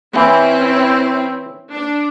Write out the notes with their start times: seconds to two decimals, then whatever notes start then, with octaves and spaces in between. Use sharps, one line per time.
0.16 E3 C4 C#4 E4
1.73 D4